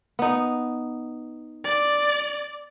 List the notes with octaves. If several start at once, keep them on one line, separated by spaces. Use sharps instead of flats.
B3 D#4
D5